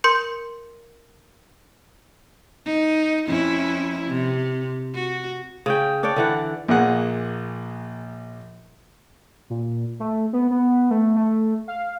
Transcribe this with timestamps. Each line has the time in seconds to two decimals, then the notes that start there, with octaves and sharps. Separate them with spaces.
0.04 A#4 C6 G6 C#7
2.66 D#4
3.26 F2 C#4 E4
4.09 C3
4.95 F#4
5.66 C#3 C#4 G5
6.03 D4 C#5 D5 G5
6.16 D3 E3 F#5
6.68 A#1 A#2 A#3 G#4 F#5
9.50 A#2
10.00 A3
10.33 B3
10.51 B3
10.91 A3
11.16 A3
11.68 F5